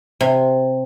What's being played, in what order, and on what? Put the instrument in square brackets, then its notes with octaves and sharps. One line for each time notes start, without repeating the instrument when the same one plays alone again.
[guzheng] C3